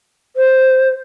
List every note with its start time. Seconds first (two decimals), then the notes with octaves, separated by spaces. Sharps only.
0.36 C5